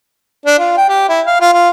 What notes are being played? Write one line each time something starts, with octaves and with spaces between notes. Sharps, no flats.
D4
F4
G5
G4
E4
F5
F4
F4